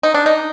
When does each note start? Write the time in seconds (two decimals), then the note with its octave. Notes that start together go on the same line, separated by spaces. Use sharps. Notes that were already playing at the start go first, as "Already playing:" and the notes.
0.03 D#4
0.14 D4
0.26 D#4